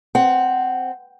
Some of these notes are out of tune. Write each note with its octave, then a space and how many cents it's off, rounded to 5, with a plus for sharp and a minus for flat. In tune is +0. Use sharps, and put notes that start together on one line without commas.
C4 +0 F#5 +15